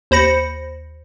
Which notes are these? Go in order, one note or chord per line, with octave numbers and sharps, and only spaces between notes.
D#2 C5 B5 A#6 C#7